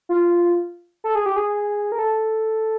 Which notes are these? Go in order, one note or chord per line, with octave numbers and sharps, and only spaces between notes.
F4
A4
G#4
G4
G#4
A#4
A4